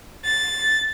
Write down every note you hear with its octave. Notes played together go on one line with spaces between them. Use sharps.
A6